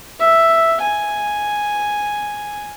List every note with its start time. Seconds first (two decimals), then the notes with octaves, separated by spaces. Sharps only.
0.20 E5
0.82 G#5